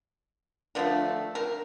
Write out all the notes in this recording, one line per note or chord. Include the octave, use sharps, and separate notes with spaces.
D3 F3 A3 A#4
A#4